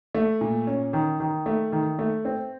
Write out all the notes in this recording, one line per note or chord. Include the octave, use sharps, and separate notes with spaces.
A3
A#2
C#4
D#3
D#3
A3
D#3
A3
C4